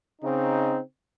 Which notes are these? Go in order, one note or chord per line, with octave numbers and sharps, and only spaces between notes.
C#3 C4 D#4